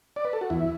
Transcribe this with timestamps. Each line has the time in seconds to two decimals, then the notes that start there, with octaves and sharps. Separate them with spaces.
0.16 D5
0.25 B4
0.33 A4
0.41 F#4
0.50 E2 E4